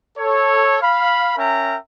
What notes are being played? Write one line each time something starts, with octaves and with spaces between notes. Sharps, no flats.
A4 C#5
F5 B5
C#4 A#4 E5 G5 A#5